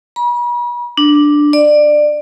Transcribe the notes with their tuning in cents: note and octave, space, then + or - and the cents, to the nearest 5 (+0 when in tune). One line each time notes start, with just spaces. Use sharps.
B5 -45
D4 +5
D5 +20